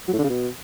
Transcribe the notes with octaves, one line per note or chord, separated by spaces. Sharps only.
F#3
A2
D3
C#3
B2